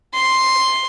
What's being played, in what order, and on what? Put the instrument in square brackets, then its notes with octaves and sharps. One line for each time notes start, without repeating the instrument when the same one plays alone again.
[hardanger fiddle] C6